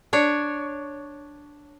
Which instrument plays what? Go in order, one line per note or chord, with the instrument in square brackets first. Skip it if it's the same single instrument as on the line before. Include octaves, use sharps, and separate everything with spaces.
[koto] D4 C#5